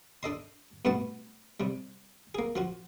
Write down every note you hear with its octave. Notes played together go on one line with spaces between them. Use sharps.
D4 A4 D#5 C6
G2 B2 A3 B3 F#4 A5
C3 G3
A#3 G#4
F3 F4 F#4